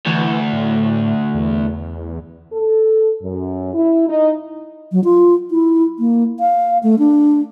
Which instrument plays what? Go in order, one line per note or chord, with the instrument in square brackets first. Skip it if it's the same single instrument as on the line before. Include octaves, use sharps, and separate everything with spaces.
[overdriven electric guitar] D2 [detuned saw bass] E3
[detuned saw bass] A2
E2
[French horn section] A4
F#2
E4
D#4
[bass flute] F#3
F4
E4
A#3
F5
A3
D4